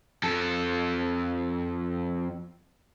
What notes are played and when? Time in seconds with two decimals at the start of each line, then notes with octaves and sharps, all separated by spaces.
0.23 F2 A4